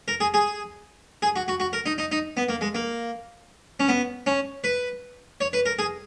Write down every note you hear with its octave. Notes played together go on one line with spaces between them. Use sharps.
A#4
G#4
G#4
G#4
F#4
F#4
F#4
A#4
D#4
D#4
D#4
B3
A#3
G#3
A#3
C#4
B3
C#4
B4
C#5
B4
A#4
G#4